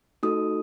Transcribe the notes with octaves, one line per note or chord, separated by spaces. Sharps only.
A3 D#4 F#4 A4 D#6